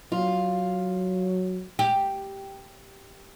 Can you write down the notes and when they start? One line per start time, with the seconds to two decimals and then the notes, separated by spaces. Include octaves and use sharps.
0.12 F#3 F4
1.79 G4